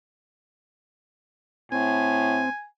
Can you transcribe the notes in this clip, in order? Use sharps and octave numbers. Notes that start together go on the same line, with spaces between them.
A2 C4 G#5